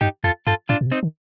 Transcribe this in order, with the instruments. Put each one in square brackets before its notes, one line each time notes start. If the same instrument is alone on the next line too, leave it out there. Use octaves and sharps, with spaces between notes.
[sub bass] G2 [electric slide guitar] D#4 G4
[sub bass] F2 [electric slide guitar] F4 A4
[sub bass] G2 [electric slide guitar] F4 A4
[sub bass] A2 [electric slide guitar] D4 F4
[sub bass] A#2
C3
[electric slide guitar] C4 D#4
[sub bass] D#3